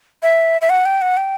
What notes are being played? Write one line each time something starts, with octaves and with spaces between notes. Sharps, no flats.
E5
E5
F#5
G5
F#5
G5